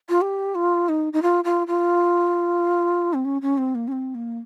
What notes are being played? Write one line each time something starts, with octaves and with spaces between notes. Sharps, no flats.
F4
G4
F4
D#4
D#4
F4
F4
F4
C4
C#4
C#4
C4
A#3
C#4
C4
A#3